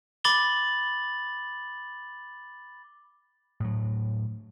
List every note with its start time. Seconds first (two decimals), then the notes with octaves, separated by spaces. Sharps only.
0.24 B5 D6 A6 F#7 G7
3.60 A2 F#3